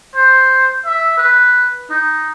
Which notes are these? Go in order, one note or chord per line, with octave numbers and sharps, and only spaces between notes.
C5
E5
B4
D#4